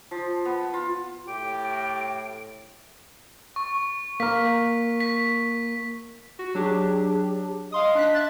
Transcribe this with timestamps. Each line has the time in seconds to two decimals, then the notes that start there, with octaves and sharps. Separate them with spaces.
0.11 F3
0.45 B3
0.73 F4
1.28 A2 G4 D7
3.56 C#6
4.20 A#3 A#4 B6
5.00 B6
6.39 F#4
6.55 F#3 D4 G4 G#4
7.72 D#5 F5 C6 D#6
7.95 D4 F#6 B6
8.14 E5 F#6 A6